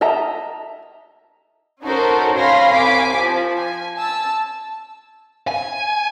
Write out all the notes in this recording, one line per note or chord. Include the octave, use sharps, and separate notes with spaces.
D#5 E5 A5 A#5
C#4 D#4 F#4 A4 A#4 C5
C#5 F5 G#5 B5 C6 A#6
C2 G#5 D6 B6
F3
G#5
A5 E6
G#5